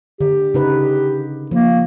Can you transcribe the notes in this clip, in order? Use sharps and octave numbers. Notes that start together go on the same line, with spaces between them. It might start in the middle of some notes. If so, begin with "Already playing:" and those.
D3 G4
C#3 D#4 B4
F3 A#3